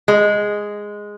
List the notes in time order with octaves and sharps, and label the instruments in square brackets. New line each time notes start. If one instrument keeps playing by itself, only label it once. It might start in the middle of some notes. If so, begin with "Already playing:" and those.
[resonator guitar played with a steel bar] G#3